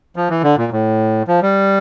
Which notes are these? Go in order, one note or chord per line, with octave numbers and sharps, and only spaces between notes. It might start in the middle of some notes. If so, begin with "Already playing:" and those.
F3
E3
D3
A#2
A2
F3
G3